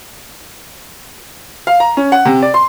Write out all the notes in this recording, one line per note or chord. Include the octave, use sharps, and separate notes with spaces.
F5
A#5
C#4
F#5
C3
D5
C6